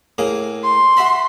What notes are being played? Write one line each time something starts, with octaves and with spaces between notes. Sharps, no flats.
A2 A#3 G#4
C6
F#4 E5 B5